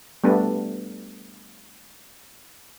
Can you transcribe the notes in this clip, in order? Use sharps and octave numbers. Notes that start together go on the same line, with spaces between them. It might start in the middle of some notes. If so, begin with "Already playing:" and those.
G3 A3 B3 D4